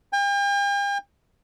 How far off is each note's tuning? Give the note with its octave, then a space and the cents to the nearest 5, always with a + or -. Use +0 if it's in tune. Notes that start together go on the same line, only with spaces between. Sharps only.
G5 +45